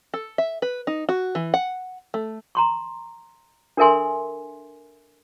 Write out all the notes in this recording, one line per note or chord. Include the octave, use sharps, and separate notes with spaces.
A4
E5
B4
D#4
F#4
E3
F#5
A3
A#5 C6 C#6
D4 A4 A#4 E5 G#5 C6